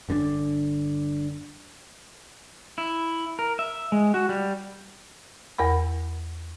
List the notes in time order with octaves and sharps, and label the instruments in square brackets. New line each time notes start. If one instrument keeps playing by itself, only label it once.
[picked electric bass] G1 D3 C4 D4
[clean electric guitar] E4
A#4
E5
G#3
F#4
G3
[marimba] E2 A#4 F#5 B5